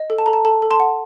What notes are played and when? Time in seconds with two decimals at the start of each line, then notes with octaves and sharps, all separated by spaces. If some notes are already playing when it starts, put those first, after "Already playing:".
Already playing: D#5
0.10 A4
0.18 A5
0.26 A4 A#5
0.33 A5
0.45 A4 A5
0.62 A4
0.71 A5 C6
0.80 F#5